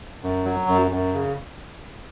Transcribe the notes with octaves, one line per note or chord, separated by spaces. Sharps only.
F#2
F#3
F#2
F#2
C#3